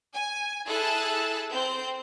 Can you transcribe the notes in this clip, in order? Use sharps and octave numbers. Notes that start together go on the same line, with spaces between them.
G#5
E4 G#4 A4 A5 E6 F#6
C4 C5 G6